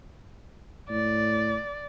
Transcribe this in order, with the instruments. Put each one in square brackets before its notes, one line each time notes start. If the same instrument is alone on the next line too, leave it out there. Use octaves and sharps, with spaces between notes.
[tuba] A2 [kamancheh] D5